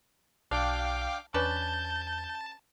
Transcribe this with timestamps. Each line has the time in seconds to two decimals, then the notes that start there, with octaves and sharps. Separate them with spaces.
0.51 B1 D4 F5 G5 D6
1.34 E2 C#4 D4 B4 A5 G6